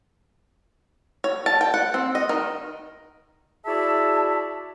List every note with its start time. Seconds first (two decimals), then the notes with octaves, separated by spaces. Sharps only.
1.24 C#5
1.46 A5
1.61 G5
1.74 F#5
1.94 C4
2.15 D#5
2.29 D#3
3.65 E4 F#4 G#4 D5 E5 A5